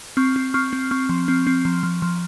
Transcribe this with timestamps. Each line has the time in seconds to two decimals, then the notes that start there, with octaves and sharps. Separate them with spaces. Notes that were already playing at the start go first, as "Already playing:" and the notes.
0.17 C4 C#6 F6
0.36 C4
0.54 C4 C#6 F6
0.73 C4
0.91 C4 C#6 F6
1.09 F3
1.28 C4
1.47 C4
1.65 F3
1.83 F3
2.02 F3